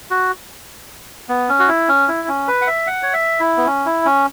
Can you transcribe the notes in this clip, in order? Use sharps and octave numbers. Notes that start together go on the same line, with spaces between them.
F#4
B3
C#4
F#4
E4
C#4
E4
C#4
B4
F#5
E5
F#5
C#5
E5
E4
B3
C#4
E4
C#4